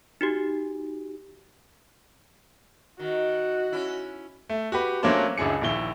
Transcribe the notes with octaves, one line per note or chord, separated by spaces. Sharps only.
D#4 F#4 G4
D#3 F#4
C#4 E4
A3
F#4 G4 B4
F#3 A3 A#3 C#4 D4 C5
C#2 F#2 D4 E4 G#4 C#7
A#1 D#2 E4 G7